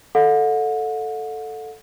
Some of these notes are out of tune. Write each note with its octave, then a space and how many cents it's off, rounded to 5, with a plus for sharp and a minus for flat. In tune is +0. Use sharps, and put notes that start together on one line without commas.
A4 +0 D#5 +0 F#5 -40